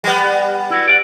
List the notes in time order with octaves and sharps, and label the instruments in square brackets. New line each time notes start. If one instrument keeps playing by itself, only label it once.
[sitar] G3 B3
[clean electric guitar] E4 F#4
D5 F5 F#5